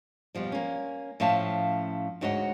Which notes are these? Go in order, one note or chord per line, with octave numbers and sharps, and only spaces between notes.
F2 B2 F3 G3
A#3 C#4
A2 F3 C#4 E5 F5 A5
D2 G#2 F#4 C#5 D#5 F#5